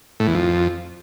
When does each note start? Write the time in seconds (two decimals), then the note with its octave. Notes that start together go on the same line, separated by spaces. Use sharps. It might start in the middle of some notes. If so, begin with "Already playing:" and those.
0.20 A2
0.27 E2
0.35 F2